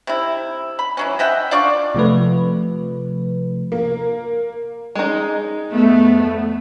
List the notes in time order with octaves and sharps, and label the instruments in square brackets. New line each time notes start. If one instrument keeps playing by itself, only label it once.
[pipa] C3 E4
B5
E3 F#3 C#4
D#5 E5 F#5 G5
D4 F4 D5 C#6
[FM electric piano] C3 F3 A3 B4
[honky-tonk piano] A#3
[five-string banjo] G#3 D#4
[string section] F2 B3 [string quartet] A3